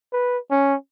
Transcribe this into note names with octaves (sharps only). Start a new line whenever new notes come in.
B4
C#4